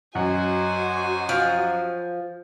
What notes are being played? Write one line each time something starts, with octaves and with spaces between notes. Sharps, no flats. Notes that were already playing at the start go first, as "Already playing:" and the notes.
F#2 F#4 C5 D#5 G#5
F3